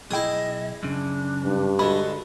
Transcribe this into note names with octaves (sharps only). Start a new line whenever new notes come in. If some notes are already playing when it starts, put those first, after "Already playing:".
B1 E4 G#4 D#5 G5
F#2 C#3 D4
G2
D3 G#3 F#4 A4 B5